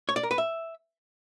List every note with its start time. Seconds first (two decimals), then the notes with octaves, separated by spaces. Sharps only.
0.09 C#5
0.16 D5
0.23 A#4
0.31 B4
0.38 E5